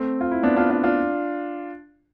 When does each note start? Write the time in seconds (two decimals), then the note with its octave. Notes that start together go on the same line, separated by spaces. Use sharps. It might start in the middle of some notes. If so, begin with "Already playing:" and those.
Already playing: A3 C4
0.21 F4
0.31 E4
0.43 B3 D4
0.56 D4 F4
0.70 D4 F4
0.84 D4 F4